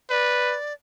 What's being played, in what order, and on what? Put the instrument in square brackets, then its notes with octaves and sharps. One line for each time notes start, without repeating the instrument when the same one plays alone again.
[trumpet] B4 [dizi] D5